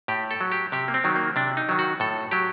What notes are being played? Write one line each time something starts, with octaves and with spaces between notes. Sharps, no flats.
A2 G4
A4
F#3
G4
C3 G4
A#3
C4
D#3 F#3
A#3
C3 D4
D#4
D#3 F#3
F#4
A2 A4
F#3 G4